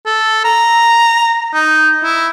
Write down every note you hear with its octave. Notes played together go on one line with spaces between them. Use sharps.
A4
A#5
D#4
E4